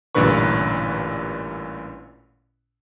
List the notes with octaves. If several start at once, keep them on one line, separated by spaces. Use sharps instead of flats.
A1 G2 A#2 D3 B4 C#6